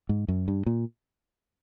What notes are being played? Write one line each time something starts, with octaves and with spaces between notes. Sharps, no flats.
G#2
F#2
G2
A#2